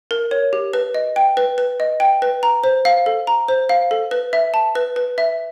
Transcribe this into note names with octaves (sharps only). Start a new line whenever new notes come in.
A#4
C#5
G4
B4
D#5
G5
B4
B4
D#5
G5
B4
A#5
C5
F5
A4
A#5
C5
F5
A4
B4
E5
A5
B4
B4
E5